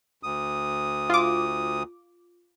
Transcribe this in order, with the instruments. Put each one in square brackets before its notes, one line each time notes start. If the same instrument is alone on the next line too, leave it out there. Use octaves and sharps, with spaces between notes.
[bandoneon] D2 D#6
[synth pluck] F4 D6